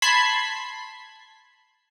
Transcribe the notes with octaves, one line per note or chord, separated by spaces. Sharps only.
A5 B5 C6 G#6 B6 C7